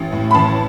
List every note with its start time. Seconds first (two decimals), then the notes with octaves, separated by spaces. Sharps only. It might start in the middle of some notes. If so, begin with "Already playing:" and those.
Already playing: A1
0.12 A2
0.31 B5
0.35 A1 A5